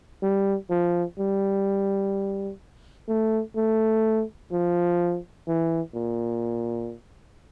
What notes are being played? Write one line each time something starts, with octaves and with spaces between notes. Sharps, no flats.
G3
F3
G3
A3
A3
F3
E3
A#2